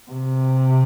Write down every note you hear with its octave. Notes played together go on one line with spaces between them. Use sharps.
C3